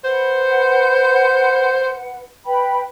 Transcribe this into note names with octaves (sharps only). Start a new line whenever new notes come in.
B4 C5 F#5
B4 G5 B5